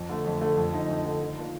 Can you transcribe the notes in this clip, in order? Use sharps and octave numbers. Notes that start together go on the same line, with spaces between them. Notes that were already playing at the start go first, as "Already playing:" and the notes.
Already playing: F2
D3 A3
F2
D3 A3
F2
D3 A3 D#4
F2
D3 A3 D#4
D#3
A#3 D4 F4 A#4